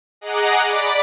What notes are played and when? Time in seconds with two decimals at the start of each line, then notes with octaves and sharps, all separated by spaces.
0.21 G#4 D#5 F#5 A#5 D6 F#6
0.65 D5 B5 D6